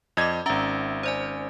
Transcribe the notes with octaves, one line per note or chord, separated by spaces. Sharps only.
F2 D5 D#5 D6 G#6
G#1 C#4 E5 A#5
C5 D5 G#5